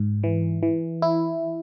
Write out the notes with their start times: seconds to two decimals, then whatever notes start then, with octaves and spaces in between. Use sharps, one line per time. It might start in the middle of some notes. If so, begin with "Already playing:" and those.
Already playing: G#2
0.24 E3
0.63 E3
1.02 E4